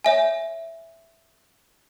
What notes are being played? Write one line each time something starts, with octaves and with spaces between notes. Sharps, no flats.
C#5 E5 G#5